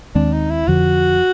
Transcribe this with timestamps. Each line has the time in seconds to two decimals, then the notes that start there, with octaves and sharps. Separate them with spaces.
0.15 D#2 D#3 G#3 C4 D4
0.33 D#4
0.50 E4
0.68 F2 D3 F3 F#4